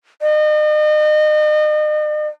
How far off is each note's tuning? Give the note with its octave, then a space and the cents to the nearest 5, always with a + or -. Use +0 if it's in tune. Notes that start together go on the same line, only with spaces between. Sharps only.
D#5 -40